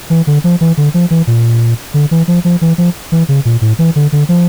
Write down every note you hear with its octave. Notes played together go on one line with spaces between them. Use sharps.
E3
D3
F3
E3
D3
F3
E3
A#2
D3
E3
F3
F3
E3
F3
E3
C#3
A#2
A2
E3
D3
D3
F3